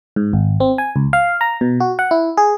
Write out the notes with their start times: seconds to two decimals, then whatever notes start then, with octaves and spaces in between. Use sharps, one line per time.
0.16 G#2
0.33 G#1
0.60 C4
0.78 G#5
0.96 C#2
1.13 F5
1.41 A#5
1.61 B2
1.80 F#4
1.99 F#5
2.11 E4
2.37 G#4